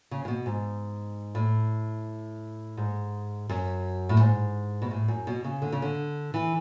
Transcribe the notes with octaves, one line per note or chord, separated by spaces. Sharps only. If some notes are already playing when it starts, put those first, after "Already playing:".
C#3
A2
B2
G#2
A2
G#2
F#2
A2
G#2
B2
A2
F#2
B2
C#3
D3
C#3
D3
E3